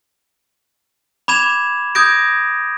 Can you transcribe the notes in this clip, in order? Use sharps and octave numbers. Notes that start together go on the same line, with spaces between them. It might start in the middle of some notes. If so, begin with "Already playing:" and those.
B5 D6 G#6 E7 F7
D#6 G6 G#6 A#6 D7